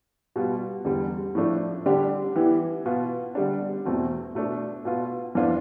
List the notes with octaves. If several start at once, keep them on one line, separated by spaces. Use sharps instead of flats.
B2 G3 B3 F4
E2 D3 G3
A2 F3 A3 D4
D3 G3 D4 G4
E3 B3 E4 G4
B2 B3 F4
D3 G3 D4
E2 B2 A3 C4
B2 A3 D4
B2 B3 F4
F2 E3 B3 D4 F4